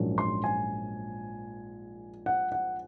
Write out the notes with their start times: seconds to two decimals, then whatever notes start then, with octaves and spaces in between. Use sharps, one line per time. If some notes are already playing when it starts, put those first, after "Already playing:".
Already playing: A#1 G#2 F#3 A#3 C#4
0.18 C6
0.44 G#5
2.26 F#5
2.52 F#5